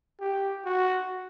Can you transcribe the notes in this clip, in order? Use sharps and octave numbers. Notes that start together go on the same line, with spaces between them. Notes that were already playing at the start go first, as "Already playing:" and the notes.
G4
F#4